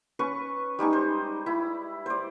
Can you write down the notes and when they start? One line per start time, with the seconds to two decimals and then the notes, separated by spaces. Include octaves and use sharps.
0.19 C#4 B4 C#6
0.79 G3 G#3 D#4 C#6
0.93 C5
1.46 E4 B5
2.06 C5 D5